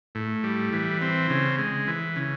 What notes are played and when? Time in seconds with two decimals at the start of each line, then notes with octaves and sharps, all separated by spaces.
0.15 A2
0.43 G3
0.73 E3
1.01 C4
1.30 C#3
1.59 G#3
1.87 E3
2.16 C#3